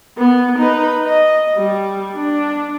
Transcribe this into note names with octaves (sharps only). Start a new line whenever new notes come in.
B3
D#4 B4
D#5
G3
D4